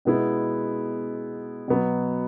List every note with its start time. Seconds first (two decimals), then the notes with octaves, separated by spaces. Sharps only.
0.05 B2 G#3 B3 E4
1.68 B2 F#3 B3